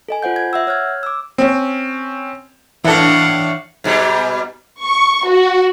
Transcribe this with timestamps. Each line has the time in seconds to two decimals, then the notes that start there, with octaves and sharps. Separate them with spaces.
0.08 A4 D#5 G#5
0.23 F4 C5 F#5 G6
0.36 G#6
0.53 E5 F#5 E6
0.67 C#5 F6 F#6 G#6
1.03 D6 E6
1.38 C4 C#4
2.85 A2 E3 D4 E4 A4 F5 F#5
3.84 G#2 B2 G3
4.82 C#6
5.27 F#4